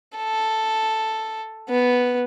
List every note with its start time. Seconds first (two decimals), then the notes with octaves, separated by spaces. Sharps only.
0.17 A4
1.70 B3